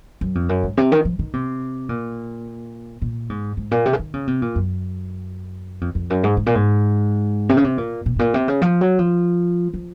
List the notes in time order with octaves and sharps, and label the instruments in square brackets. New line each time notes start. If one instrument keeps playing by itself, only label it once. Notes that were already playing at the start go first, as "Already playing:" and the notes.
[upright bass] F#2
F2
F#2
G#2
C3
D#3
F3
D#3
C3
A#2
A#2
G#2
G#2
A#2
C3
C#3
D#3
C#3
C3
A#2
F#2
F2
F2
F#2
G#2
G#2
A#2
G#2
C3
C#3
C3
A#2
A#2
G#2
A#2
C3
C#3
F3
F#3
F3
F3